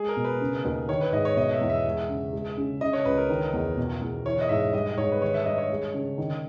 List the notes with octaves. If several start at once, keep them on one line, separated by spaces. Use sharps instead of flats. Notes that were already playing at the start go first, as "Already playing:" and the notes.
Already playing: G#3 G#4
A#4
B2
B4
C#3
D#2
D#3 C#5
B4
G#2 D#5
C#5
B2 D#5
E5
E2
E5
G#3
C#3
G#3
C#3
C#3 D#5
C#5
C#2 B4
A#4
D#3
E2
B2
E2
E3 C#5
D#5
G#2 E5
G3 D#5
G#2 C#5
B4
D#3 C#5
E5
G2 D#5
C#5
G#3
C#3
D#3